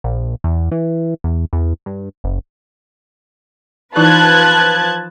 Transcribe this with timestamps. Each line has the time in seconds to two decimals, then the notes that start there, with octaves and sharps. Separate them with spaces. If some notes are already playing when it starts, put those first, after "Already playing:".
0.04 A#1
0.44 E2
0.72 E3
1.24 E2
1.53 E2
1.86 G2
2.24 F#1
3.96 E3 F3 D#4 E4 B4 A5 F#6 G#6